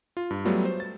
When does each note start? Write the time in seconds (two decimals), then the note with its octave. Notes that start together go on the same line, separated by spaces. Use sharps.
0.17 F4
0.30 G2
0.45 F#3 G3 A3 B3 F4
0.65 C5
0.80 A6